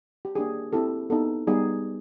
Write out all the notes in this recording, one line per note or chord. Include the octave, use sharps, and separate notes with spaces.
G4
A#3 D4 G4 G#4
C4 E4 G4 A4
B3 D#4 G4 A4
G3 B3 D#4 G4 G#4